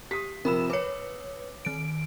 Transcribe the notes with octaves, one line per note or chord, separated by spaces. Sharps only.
G4 D#6 B6
C3 F3 A#4 B5 E6 E7
B4 C#5 D6 C#7
D#3 D7